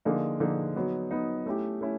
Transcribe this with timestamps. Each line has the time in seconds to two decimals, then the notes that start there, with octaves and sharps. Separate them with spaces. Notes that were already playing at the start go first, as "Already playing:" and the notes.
0.05 D3 F3 A#3 D#4 G#4
0.40 D3 F3 A#3 D#4 G#4
0.76 F#3 B3 D#4
1.11 F#3 B3 D#4
1.46 A3 C#4 E4 G4
1.81 A3 C#4 E4